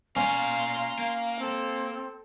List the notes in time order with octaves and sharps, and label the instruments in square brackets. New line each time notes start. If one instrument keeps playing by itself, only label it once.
[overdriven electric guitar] A#3 D5 [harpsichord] C#4 [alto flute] F5 [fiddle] A#5 C6
[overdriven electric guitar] A#3 [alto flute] F5
[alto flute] C4 [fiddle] A4